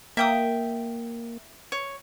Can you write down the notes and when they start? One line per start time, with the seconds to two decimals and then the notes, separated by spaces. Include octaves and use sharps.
0.17 A#3 E5 G5 D#6
1.72 C#5